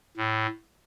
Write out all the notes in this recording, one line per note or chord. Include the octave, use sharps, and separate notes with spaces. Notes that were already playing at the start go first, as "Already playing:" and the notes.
A2